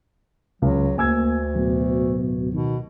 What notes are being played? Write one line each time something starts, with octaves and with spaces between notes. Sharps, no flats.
C#2 F#3
D2 A#3 G#5 E6 G#6
D1 B2
B2 D#3